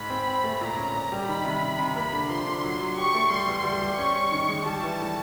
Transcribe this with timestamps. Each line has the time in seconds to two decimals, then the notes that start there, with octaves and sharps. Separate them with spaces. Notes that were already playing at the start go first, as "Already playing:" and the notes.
Already playing: G#2 B5
0.10 C4
0.27 C4
0.44 A3
0.61 A#2 A#5
0.77 C#4
0.95 A#2
1.12 G3
1.29 D#3 B5
1.45 C3
1.62 C3
1.79 C3
1.96 A#3 B5
2.13 D3
2.29 F3 C6
2.46 D3
2.63 F#3
2.80 F#3
2.97 G4 C#6
3.14 A3
3.30 G3 C6
3.47 E2
3.64 G3
3.82 G3
3.98 C#4 C#6
4.15 C#4
4.32 D#3
4.49 G#3
4.66 G3 A5
4.82 E3
4.99 A2